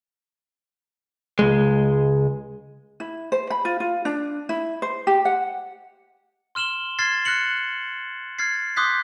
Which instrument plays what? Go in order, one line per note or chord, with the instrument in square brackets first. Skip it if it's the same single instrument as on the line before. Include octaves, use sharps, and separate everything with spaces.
[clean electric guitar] C#2 G#3
[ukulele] E4
C5
B5
F4
F4
D4
E4
C5
G4
F#5
[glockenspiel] C6 F6 E7 F#7 G7
C6 F6 G#6 A6 C7
F6 F#6 A#6 C#7 F#7
F6 G#6 A6 C7
C6 D6 D#6 F#6 G6 B6